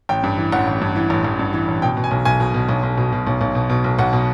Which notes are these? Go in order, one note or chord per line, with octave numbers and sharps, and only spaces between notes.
A1 G5
G2
E3
A1 F#5
A1
G2
E3
A1
A1
G2
E3
A1
B2 G5
B2
G#5
B1
B1 G#5
B2
B2
B1
B1
B2
B2
B1
B1
B2
B2
B1
B1 F#5
B2